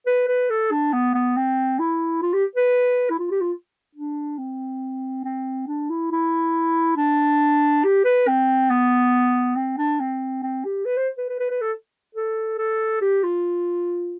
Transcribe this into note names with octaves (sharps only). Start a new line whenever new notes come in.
B4
B4
A4
D4
B3
B3
C4
E4
F4
G4
B4
E4
F4
G4
F4
D4
C4
C4
D4
E4
E4
D4
G4
B4
C4
B3
C4
D4
C4
C4
G4
B4
C5
B4
B4
B4
B4
A4
A4
A4
G4
F4